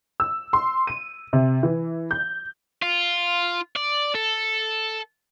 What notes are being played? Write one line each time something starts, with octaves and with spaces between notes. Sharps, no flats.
E6
C6
D#7
C3
E3
G6
F4
D5
A4